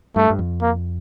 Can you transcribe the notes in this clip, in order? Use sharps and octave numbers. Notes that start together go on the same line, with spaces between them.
G2 A3
G2
F2
A#3